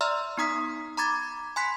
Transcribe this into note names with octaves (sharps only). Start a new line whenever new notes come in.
D5 E5 A#5 C6 E6 F6
B3 D#4 A#5 D#6 B6
A#5 B5 D6 G#6 A6
G#5 B5 C6 F#6 B6